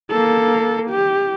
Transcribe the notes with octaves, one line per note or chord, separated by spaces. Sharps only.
A#3 A4
G4